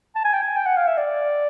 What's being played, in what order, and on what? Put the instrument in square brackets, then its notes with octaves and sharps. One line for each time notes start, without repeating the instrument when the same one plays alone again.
[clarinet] A5
G#5
G5
G#5
G5
F#5
F5
E5
D5